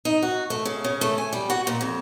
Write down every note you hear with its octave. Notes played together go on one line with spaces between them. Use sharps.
D#4
F#4
A3
C#3
C#3
A3
G#5
G3
F#4
A#2
F2